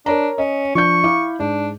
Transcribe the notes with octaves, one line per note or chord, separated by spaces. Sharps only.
D4 A#4 C#5 A#5
C#4 D#5
F3 D4 C#6 G6
E4 F5 D6
G#2 D4